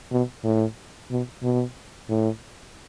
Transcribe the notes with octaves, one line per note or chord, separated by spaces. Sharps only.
B2
A2
B2
B2
A2